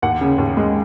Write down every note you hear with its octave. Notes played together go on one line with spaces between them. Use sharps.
D#2 F#5
C#3
D#2
G#3